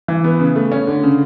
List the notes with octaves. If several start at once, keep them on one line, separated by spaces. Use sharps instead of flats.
E3
B3
C#3
A3
C#4
D3
C#3